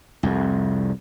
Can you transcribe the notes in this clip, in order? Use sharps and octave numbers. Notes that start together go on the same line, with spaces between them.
C2 F2